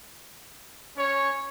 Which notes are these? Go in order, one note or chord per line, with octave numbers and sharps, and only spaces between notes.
C#4 C#5